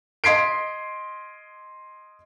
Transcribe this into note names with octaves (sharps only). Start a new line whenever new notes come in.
D#5 C6 G#6 B6 C7 D7